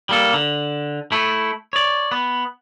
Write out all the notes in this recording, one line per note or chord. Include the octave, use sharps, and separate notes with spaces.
G3 A#3 A4
D3
A3 E4
C#5 D5
B3